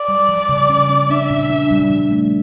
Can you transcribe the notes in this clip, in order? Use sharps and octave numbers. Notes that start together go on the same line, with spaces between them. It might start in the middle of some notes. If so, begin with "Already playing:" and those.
Already playing: D5
G3
F3
C#3
C#4
C#4
D4 E5
A#2
D4
G3
F3
A3